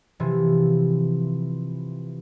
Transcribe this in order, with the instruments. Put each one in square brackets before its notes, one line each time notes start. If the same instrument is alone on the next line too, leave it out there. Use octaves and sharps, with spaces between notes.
[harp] C3 E3 F3